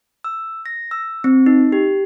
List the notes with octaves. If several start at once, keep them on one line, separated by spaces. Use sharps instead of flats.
E6
A#6
E6
C4
D#4
G4